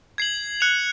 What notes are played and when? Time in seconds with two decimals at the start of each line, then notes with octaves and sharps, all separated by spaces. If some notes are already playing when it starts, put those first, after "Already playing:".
0.18 G#6 C7 F#7
0.61 F#6 C#7 F7